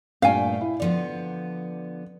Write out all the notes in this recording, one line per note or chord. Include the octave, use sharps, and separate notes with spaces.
G2 A#2 A3 F5 G5 G#5
E4
D3 F3 B3 D5